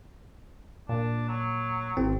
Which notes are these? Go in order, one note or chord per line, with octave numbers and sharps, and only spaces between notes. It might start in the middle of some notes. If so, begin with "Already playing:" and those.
A#2 D4
F#3
G#1 C4